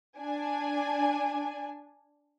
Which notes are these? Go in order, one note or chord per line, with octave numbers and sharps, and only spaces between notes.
D4 G#5